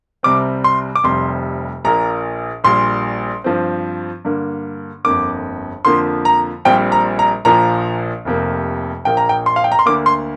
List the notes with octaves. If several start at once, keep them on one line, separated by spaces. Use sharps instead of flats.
C2 C3 G3 C4 D6
C6
D6
F1 F2 C3 G3 C6
A#1 A#2 A#3 A#5
A#1 A#2 G3 C6
G2 F3 C4
G2 D3 A#3
G1 F2 D3 A#3 D6
F2 D3 F3 A#3 C6
A#5
A#1 A#2 G3 C4 G5
A#5
A#5
A#1 A#2 F3 A#3 A#5
F1 F2 C3 A#3
A#1 A#2 A#3 G5
A#5
G5
C6
F5
G5
A#5
C6
D2 D3 A#3 D6
C6